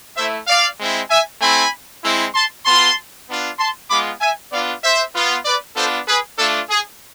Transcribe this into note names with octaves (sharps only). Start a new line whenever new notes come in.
A3 E4 C5 E5
D5 F5
G#3 C4 E4
E5 G#5
A3 C4 E4 G#5 B5
G#3 C4 E4
A5 C6
B3 F4 A5 C6
B3 D4 F4
A5 C6
G#3 B3 F4 B5 D6
E5 G#5
B3 D4 F4 D5 F5
C5 E5
B3 F4
B4 D5
B3 D4 F4 A4 C5
G#4 B4
A3 D4 F4 A4
G#4